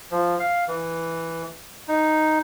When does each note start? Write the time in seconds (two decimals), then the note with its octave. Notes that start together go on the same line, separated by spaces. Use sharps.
0.11 F3
0.40 F5
0.68 E3
1.88 D#4